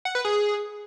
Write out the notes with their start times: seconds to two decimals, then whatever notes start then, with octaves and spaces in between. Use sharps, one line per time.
0.05 F#5
0.15 B4
0.25 G#4